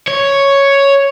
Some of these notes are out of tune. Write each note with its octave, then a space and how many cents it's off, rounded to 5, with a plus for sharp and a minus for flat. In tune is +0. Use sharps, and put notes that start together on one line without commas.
C#5 +0